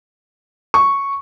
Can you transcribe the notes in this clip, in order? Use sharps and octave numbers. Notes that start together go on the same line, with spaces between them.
C#6